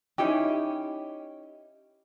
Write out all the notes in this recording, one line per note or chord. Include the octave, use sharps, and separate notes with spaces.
C#4 D#4 E4 G4